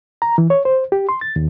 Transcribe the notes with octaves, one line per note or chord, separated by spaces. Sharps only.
A#5
E3
C#5
C5
G4
C6
A6
D#2